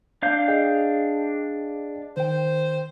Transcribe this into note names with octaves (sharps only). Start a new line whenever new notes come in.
D4 F5 G6
G#4 D#5 G5
D#3 C5 G5